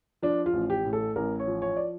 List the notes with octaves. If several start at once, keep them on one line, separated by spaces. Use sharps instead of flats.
F3 D4
F4
A1
G4
A2
A4
A1 A#4
C#5
F3
C#5
D5